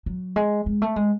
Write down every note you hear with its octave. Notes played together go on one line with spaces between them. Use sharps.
F#3
G#3
G#3
A3
G#3